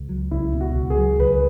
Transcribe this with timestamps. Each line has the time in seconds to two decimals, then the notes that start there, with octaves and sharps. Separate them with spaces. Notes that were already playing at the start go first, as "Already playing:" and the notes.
Already playing: C#2
0.09 F#3
0.31 C#2 E4
0.54 B2
0.61 F#4
0.75 C#2
0.90 G#4
0.98 F#3
1.19 C#2 B4